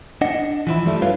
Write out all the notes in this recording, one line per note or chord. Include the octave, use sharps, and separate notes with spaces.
D4 D#5 F#5
E3 F3 E4
G2 F3 G3 A3 D4 E4
E4 F4 B4 C#5 F5